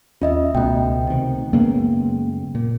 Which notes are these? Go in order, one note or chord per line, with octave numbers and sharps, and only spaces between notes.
D#2 C#4 F4 D#5 E5
C#2 B2 A3 G5
C3 D#3
F#2 C#3 G#3 A#3 B3
A#2